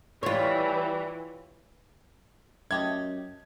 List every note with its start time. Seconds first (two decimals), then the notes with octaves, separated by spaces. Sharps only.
0.23 E3 G3 F4 C#5
2.71 F#2 A3 G4 D#5 G#6